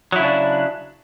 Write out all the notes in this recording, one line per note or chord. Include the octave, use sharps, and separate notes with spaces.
C#3 F#3 D4 E4